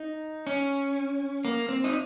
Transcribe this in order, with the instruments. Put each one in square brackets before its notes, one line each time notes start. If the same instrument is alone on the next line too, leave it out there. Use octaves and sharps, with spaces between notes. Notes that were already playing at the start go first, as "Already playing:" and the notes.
Already playing: [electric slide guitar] D#4
C#4
A#3
C4
D#4